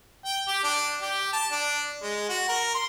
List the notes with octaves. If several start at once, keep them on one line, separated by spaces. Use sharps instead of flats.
G5
G4
D4
G4
A5
D4
G#3
F#4
A#4
C6